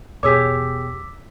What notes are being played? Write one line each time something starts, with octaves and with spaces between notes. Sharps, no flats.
E1 B2 G4 G#4 C#5 D6 E6 B6